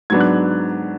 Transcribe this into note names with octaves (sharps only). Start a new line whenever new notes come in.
G#2 F#3 B3 D4 G#6
F#6